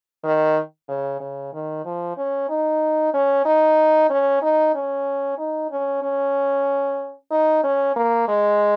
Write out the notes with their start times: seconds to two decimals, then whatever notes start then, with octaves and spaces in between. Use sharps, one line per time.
0.24 D#3
0.88 C#3
1.20 C#3
1.53 D#3
1.85 F3
2.17 C#4
2.49 D#4
3.14 C#4
3.45 D#4
4.10 C#4
4.42 D#4
4.75 C#4
5.38 D#4
5.71 C#4
6.03 C#4
7.31 D#4
7.64 C#4
7.96 A#3
8.28 G#3